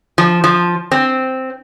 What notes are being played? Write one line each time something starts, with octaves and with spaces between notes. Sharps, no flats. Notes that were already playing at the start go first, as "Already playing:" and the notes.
F3
F3
C4